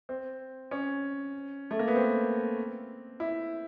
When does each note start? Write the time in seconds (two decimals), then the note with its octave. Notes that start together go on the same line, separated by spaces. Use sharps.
0.09 C4
0.71 C#4
1.71 A3
1.79 A#3
1.88 B3
1.96 C4
3.20 E4